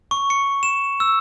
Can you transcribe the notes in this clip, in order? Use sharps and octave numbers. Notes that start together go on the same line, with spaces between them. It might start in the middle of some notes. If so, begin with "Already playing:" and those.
C#6
C#7
E7
E6